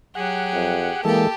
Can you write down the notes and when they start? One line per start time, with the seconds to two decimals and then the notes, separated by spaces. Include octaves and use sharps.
0.15 F#3 G4 G#4 F#5
0.53 F2
1.05 E3 G#3 A#3 G4 A4 A5